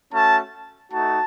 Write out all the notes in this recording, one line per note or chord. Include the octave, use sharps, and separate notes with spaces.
A3 C#4 F#4 A5
A3 D#4 F#4 A5